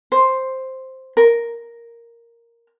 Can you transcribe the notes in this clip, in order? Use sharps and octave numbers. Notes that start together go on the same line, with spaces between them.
C5
A#4